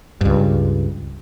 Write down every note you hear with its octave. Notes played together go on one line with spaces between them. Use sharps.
C#2 G2